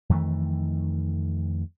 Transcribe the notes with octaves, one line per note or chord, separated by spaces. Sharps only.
F2 D#3 E3 A3